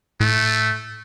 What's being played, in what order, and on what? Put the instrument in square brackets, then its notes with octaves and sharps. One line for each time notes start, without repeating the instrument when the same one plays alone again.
[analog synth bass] A2 [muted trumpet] A3